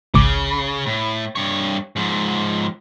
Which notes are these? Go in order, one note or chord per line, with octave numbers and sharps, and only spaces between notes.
G#1 C#2 C#3 D6
A2
G2 C#5
G#2 F3